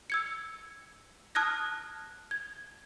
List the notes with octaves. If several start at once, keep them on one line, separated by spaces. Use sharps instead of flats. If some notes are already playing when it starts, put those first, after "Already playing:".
E6 G#6 C#7
A5 D#6 F6 F#6 G#6 A#6
G#6